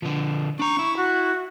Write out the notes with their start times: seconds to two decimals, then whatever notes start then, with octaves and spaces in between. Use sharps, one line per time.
0.03 D3 F3
0.60 D4 A#5 C#6
0.79 E4
0.97 F#4